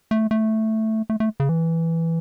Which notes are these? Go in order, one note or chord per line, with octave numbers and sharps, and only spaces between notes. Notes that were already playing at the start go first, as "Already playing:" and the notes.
A3
A3
A3
A3
C#3
E3